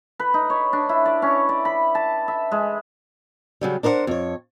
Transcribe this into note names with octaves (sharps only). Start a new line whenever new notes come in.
B4
D#4
C#5
D4
E4
D5
C#4
D5
B5
A5
E5
G#3
C#3 F#3 G3
D4 A#4 C5 D5 F#5
F2 C#5